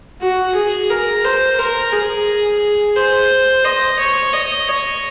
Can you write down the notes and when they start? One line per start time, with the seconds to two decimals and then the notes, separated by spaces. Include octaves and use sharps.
0.21 F#4
0.55 G#4
0.90 A#4
1.25 C5
1.59 A#4
1.93 G#4
2.96 C5
3.65 D#5
3.99 C#5
4.33 D#5
4.69 C#5